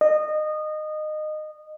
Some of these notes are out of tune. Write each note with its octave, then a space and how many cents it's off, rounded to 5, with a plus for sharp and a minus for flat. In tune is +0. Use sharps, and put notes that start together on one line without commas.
D#5 -20